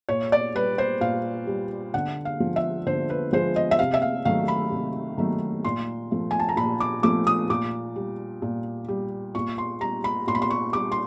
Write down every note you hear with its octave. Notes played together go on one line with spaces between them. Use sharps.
A#2 C#5
D5
G3 B4
C5
A#2 F5
G3
D3 F#5
F5
F3 G#3
E5
D3 C5
B4
F3 G#3 C5
D#5
E5
C3 F5
E5
F5
D#3 F#3 A3 F5
B5
C3
D#3 F#3 A3
A#2 C6
F3 A3
G#5
A5
A#5
A#2 B5
D6
F3 A3 D6
D#6
A#2 D6
G3
A#2
G3
A#2 C#6
C6
G3 A#5
B5
A#2 C6
B5
C6
C#6
G3 D6
C6